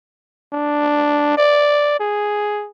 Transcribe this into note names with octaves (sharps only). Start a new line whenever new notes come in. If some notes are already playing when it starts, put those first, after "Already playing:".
D4
D5
G#4